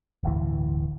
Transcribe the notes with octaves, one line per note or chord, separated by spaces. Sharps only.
D1 G1 D2 E3